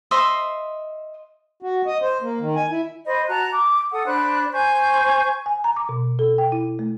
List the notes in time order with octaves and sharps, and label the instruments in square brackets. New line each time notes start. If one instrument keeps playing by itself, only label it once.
[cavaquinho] C5 D#5 E5 C6
[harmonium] F#4
D#5
C5
A#3
D#3
G#5
E4
[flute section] C5 D#5 B5
F#4 A5 A#5 F#6
D6
A4 F#5 D#6
D4 C5 B5 F#6
C5 G#5 C#6 G6
[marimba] G#5
A#5
D6
B2
A4
G5
E4
A3